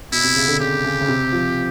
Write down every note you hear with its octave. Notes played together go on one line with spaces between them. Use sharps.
B2 E4
C3
C#3
D3
C#3 G4
C#3
C#3
C3
F3